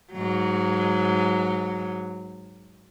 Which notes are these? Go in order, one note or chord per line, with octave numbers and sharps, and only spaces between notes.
G#2 F#3